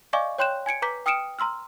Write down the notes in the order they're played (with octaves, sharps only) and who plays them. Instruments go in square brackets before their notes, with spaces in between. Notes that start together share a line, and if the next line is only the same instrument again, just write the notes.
[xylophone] D5 D#5 F5 G#5 C#6 D6
C#5 G5 C6 F#6 G6 E7
G#5 G#6 C#7 D7
B4 A#5 D6 G6 B6
G5 D#6 F6 C#7 D7 E7
A#5 C6 E6 F6